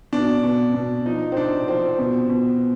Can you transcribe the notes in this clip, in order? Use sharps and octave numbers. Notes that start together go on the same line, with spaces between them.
B2 D4
B2
B2
F3 D#4
C4
C3 D4
F3 C4
B2
B2